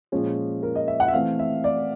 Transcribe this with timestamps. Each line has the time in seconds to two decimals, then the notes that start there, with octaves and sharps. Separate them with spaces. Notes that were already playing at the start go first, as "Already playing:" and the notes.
0.12 A#2 F3 G#3 C#4
0.63 A#4
0.75 D#5
0.88 E5
1.00 F#5
1.08 E5
1.13 E3 A3 C4 F5
1.39 E5
1.64 D5